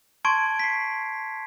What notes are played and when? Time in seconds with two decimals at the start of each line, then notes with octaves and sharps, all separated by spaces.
0.25 A5 C6 C#6 G#6 D7
0.59 B6 C7